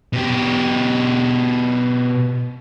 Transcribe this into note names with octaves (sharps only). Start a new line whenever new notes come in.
B2 G4